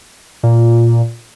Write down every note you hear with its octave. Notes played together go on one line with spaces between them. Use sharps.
A#2